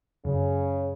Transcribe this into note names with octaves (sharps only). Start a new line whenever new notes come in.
F#1 C#3